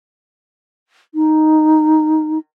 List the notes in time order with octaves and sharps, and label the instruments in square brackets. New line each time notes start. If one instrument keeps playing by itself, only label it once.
[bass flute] D#4